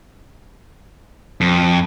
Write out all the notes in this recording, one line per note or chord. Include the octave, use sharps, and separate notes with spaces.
F2